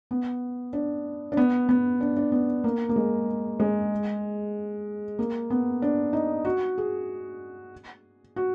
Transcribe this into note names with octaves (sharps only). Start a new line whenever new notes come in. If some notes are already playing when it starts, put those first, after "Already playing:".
B3
D4
D4
B3
B3
D4
D4
B3
A#3
A#3
G#3
G#3
A#3
B3
D4
D#4
F#4
G#4
F#4